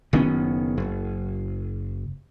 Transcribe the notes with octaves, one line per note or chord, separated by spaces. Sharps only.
F#1 D#3 B3 C#4
F#1